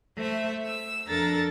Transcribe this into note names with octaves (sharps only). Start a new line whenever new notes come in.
A3 C5 E5
E6
F2 D4 A4 A#4 A#5 A6